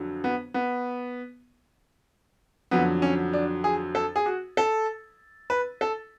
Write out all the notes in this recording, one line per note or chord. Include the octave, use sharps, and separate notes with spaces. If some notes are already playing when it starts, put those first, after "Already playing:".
Already playing: F2 D3 F#3
B3
B3
F2 D3 F#3 B3
C#4
D4
G#4
A4
G#4
F#4
A4
B4
A4